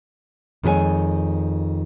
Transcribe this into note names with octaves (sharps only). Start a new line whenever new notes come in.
F2 D#3 G#3 G#4 C#5 G#5